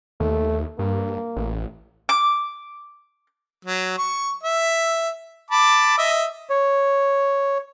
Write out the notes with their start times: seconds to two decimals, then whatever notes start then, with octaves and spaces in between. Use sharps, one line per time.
0.20 D#2 A3
0.79 G2 A#3
1.37 A1
2.09 D6
3.65 F#3
3.98 C#6
4.43 E5
5.51 A5 B5 D6
5.98 D#5 E5
6.50 C#5